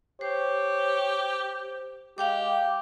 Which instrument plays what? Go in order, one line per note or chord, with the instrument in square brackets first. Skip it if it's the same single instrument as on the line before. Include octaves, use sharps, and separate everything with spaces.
[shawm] G4 [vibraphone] C5 [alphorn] C#5
[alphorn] G#3 [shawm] G4 [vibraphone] F5 G5 D6